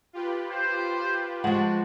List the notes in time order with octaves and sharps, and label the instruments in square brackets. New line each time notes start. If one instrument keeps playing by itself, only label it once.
[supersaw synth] F4 G4 B4
[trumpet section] C5
[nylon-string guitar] F3 G#3 [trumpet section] F#4 C5 A5 [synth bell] F#5